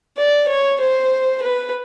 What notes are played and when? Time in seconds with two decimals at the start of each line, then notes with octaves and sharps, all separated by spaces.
0.17 D5
0.48 C#5
0.81 C5
1.43 B4